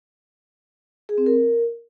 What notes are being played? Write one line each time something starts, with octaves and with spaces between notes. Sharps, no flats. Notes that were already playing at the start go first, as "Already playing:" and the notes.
G#4
C4
A#4